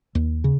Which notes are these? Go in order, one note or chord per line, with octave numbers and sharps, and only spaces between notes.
D#2
C#3